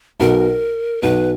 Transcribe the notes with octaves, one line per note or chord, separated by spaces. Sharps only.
B1 B2 A#4
B1 B2 B4